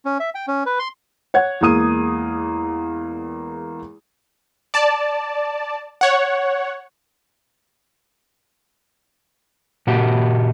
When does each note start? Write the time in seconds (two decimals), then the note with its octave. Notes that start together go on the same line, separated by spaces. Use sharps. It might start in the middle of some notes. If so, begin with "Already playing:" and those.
0.05 C#4
0.20 E5
0.35 G5
0.48 C#4
0.66 B4
0.79 C6
1.34 C#5 F#5 G#6
1.61 E2 G#3 A#3 D#6 D#7
4.74 D5 A5
6.01 C#5 F#5
9.87 A#2 F#4 G4